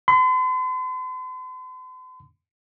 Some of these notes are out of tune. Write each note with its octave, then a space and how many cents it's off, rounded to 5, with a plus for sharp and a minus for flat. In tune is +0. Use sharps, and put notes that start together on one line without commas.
C6 -45